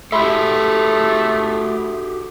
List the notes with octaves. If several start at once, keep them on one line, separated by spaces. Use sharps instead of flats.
A3 F#4 G4 A4 E5 B5 C6